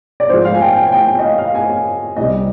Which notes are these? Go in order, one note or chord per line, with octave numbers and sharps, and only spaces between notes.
D5
G#2 F3 G#3 C5
F5
G#5
G5
G5
G#5
G5
G5
D#5
F5
F5
G#5
C2 C3 G3 D#5